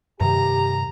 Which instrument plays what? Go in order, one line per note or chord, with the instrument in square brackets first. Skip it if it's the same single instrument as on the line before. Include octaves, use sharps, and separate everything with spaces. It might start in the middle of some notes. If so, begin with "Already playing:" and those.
[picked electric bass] G2 C3 D#3 [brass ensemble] G4 [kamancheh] A#5